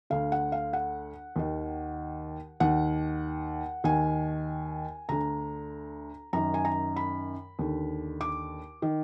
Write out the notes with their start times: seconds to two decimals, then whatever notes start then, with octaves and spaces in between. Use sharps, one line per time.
0.10 D2 D3 F5
0.32 F#5
0.52 F5
0.73 F#5
1.36 D#2 D#3
2.60 D#2 D#3 F#5
3.84 D#2 D#3 G#5
5.09 D2 D3 A#5
6.33 F#2 D#3 A#5
6.54 G#5
6.65 A#5
6.96 B5
7.59 D#2 D3
8.21 D6
8.82 D#3